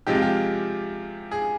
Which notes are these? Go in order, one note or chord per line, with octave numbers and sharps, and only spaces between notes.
C3 F3 G#3 G4
F4
G4
G#4